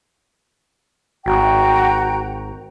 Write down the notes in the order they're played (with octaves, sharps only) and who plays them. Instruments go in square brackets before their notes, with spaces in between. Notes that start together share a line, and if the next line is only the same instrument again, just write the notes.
[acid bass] G#1 [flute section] F#4 G5 A#5